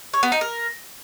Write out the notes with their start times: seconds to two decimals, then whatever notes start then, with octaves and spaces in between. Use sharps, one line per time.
0.14 C#5
0.23 B3
0.32 D#4
0.41 A#4